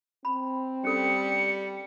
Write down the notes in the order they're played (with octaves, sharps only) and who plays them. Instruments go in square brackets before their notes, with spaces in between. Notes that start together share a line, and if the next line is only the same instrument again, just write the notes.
[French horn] C4 [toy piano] B5
[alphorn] G3 [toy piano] C#4 A4 [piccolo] C#7